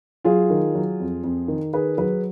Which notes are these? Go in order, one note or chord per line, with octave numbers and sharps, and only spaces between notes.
F#3 F4 G#4
D#3
F#3
F2
F2
D#3
D#3 G#4 B4
F#3 G#4 B4